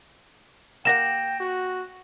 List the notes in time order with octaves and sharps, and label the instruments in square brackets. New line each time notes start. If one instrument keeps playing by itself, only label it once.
[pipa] A#3 G4 F#5 [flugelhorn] G5 [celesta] A#6 E7
[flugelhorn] F#4